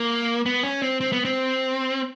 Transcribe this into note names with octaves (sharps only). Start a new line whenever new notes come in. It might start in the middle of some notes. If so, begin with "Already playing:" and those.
Already playing: A#3
B3
C#4
C4
C4
B3
C4